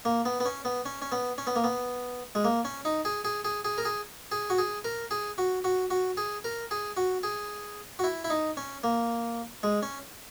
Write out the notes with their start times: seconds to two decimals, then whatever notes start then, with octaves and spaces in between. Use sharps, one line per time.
0.05 A#3
0.25 B3
0.40 B3
0.46 C#4
0.65 B3
0.86 C#4
1.02 C#4
1.12 B3
1.38 C#4
1.47 B3
1.56 A#3
1.64 B3
2.35 G#3
2.44 A#3
2.65 C#4
2.85 D#4
3.05 G#4
3.25 G#4
3.45 G#4
3.65 G#4
3.78 A#4
3.85 G#4
4.32 G#4
4.50 F#4
4.58 G#4
4.84 A#4
5.11 G#4
5.38 F#4
5.64 F#4
5.90 F#4
6.17 G#4
6.44 A#4
6.71 G#4
6.97 F#4
7.23 G#4
7.99 F#4
8.04 E4
8.24 E4
8.30 D#4
8.57 C#4
8.84 A#3
9.63 G#3
9.83 C#4